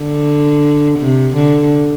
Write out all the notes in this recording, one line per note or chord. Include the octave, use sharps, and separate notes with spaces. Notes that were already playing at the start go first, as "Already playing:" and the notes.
Already playing: D3
C3
D3